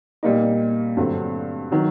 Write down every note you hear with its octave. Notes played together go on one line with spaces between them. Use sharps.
A#2 G3 A#3 D#4
G2 D3 F#3 A3 C4
D#3 F#3